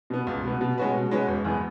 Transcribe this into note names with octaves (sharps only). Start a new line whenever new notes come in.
B2 B3
C#2
B2 B3
B2
G#3 C#4 F#4 B4
B2
G#3 C#4 F#4 B4
E1
E2 E3 G#3 B3